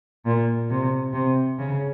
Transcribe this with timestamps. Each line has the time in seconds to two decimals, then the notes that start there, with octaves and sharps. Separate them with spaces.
0.25 A#2
0.70 C3
1.13 C3
1.58 C#3